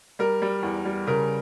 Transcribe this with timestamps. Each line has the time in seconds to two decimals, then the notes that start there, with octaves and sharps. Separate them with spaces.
0.19 G3 A#4
0.42 G3
0.63 E2
0.85 G3
1.07 C#3 A#4